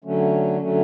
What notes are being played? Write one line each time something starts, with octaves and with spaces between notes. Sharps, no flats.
D3 F#3 A3 C#4
D3 F#3 A3 C#4